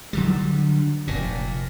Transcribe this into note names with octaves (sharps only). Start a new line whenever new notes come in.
D3 F#3 G3
F1 A#2